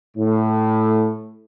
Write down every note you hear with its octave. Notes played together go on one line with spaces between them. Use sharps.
A2